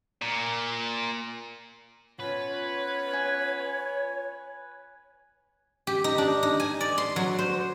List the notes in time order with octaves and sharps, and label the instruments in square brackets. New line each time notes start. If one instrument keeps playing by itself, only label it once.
[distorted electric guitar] A#2
[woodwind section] B3 C#4 F4 [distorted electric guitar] B4 [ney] C#5
[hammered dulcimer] G#5
[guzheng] G4
D#4
D4
D#4
G#5
D5
C6
F#3
C5